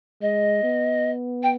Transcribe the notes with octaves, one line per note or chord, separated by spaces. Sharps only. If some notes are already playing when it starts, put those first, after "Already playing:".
G#3 D#5
B3
G5